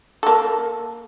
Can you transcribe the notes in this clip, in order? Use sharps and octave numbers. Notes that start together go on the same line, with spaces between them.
A#3 A4